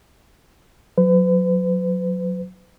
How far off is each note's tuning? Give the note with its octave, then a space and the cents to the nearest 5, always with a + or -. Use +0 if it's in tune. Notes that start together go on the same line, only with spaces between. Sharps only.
F#3 -20 B4 +40